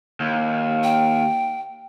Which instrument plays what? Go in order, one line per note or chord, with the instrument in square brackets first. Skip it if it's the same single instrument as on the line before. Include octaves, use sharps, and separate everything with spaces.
[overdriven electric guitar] D#2
[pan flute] G5